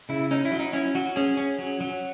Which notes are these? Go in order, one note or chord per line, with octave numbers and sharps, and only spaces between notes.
C#3 E4
C#4 D#4
E4
F#3
D#4
C#4 E4
F#3 F#4
C#4 G#4
C#4
F#3
F#3